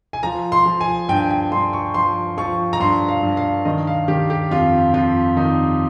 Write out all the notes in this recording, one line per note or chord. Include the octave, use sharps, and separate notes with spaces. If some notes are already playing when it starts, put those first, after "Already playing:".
G#5
F3 A#5
C6
F3
G#5
G2 G5
G5
G2 C6
C#6
F3 C6
F3 C#6
A#5
G2 C6
F5
G2
F5
D#3 D#5
F5
D#3 G4
G4
F2 F4
F2 F4
D#3 D#4